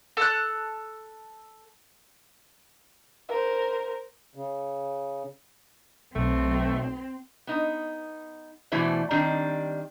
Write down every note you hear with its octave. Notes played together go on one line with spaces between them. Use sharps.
A4 F#6
A#4 C5
C#3
B1 A3 C4
B3 D#4
B2 E3 A3 E4 C5 D5
D#3 G3 C4 D4